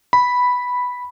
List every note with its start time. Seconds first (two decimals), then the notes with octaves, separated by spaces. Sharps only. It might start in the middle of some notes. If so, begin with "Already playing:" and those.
0.13 B5